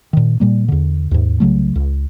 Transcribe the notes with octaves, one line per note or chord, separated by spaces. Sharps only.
A#2 D#3
A#2 G3 A#3
E2 D3
D#2 G#2
C2 C#3 F#3 A3
C#2